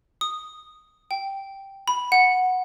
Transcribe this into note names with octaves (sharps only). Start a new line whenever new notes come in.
D#6
G5
B5
F#5